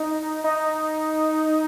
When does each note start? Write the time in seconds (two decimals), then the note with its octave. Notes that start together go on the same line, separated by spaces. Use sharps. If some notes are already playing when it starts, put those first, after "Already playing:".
Already playing: D#4
0.44 D#4